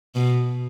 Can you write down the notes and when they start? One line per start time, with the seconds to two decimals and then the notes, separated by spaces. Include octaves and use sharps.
0.15 B2